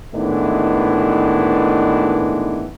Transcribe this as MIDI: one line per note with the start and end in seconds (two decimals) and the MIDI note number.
0.14 2.68 45
0.14 2.68 51
0.14 2.68 52
0.14 2.68 56
0.14 2.68 59
0.14 2.68 62